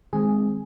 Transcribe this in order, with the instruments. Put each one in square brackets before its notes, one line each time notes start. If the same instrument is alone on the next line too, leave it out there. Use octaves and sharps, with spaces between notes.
[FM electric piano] D#3 G#3 C4 G#4